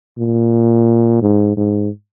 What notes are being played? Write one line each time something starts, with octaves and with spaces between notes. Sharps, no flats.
A#2
G#2
G#2